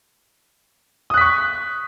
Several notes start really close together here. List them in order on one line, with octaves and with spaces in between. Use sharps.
D#6 F#6 B6 C#6